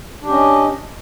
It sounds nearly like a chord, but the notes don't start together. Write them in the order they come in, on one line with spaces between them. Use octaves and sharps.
D4 G4 C#4 D#5